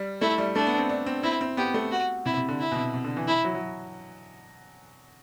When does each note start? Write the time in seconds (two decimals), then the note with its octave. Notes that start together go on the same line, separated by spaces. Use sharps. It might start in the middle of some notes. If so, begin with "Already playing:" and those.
Already playing: G3
0.21 A3 E4
0.38 G3
0.55 A3 D4
0.67 B3
0.78 C4
0.89 D4
1.06 C4
1.23 C4 E4
1.41 C4
1.57 B3 G4
1.74 A3
1.92 F#4
2.26 C3 E4
2.37 C3
2.49 D3
2.60 E4
2.72 B2
2.76 C3
2.94 C3
3.04 D3
3.17 E3
3.28 E4
3.44 F#3
3.55 F#3